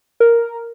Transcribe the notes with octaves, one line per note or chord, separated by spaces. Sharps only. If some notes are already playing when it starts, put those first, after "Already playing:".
A#4